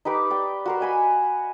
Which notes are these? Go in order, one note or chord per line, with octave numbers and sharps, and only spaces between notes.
D#4 G4 B4 D6
D5 G5
F#4 A#4 C6
D#5 G#5 B5